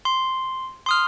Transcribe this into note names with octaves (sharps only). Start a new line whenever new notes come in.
C6
C6 D#6 F6